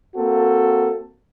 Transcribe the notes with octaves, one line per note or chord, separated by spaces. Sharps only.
A#3 C4 F#4 A4